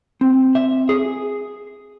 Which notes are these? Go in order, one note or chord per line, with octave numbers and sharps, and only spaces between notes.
C4
E5
G#4